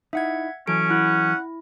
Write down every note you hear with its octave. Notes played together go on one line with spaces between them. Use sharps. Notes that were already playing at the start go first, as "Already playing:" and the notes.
D#4 E4 E5 F#5 G#6
E3 F#3 C#4 A4 D7
E4 F#5